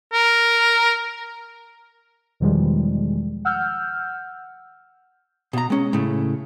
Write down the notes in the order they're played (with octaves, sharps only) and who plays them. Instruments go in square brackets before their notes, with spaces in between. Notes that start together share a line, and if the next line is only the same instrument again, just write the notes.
[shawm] A#4
[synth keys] E2 B2 D#3 F3 G3 G#3
F#5 E6 F6 G6
[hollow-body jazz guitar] B2 A#5
G#3 C#4
A2 C#3